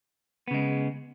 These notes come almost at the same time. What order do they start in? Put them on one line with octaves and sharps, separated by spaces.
B3 C#3 G#3